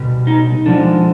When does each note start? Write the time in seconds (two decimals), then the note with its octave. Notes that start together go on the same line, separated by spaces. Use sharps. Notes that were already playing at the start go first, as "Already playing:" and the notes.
Already playing: B2 G3
0.27 D#4
0.66 D3 F3 G#3 D4